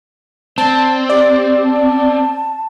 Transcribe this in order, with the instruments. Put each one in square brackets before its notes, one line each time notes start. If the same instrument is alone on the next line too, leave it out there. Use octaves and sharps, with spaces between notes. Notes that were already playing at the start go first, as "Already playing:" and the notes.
[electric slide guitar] C4 [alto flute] D5 [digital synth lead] A5
[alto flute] G4 [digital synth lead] D5
[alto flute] A5